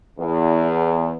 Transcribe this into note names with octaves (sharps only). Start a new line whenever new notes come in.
E2